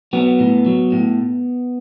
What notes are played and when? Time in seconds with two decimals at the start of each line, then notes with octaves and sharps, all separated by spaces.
0.13 F#3 B3
0.39 A2
0.66 F#3
0.92 A2